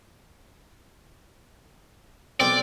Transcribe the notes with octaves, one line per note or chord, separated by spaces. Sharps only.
B1 C4 D5